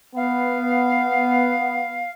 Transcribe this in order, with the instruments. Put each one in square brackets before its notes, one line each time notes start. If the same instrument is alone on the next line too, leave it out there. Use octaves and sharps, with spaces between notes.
[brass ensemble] B3 [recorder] F5